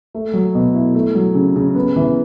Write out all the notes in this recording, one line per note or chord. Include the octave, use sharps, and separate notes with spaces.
A3
F#3
B2
E4
A3
F#3
C#3
C#3
B3
E3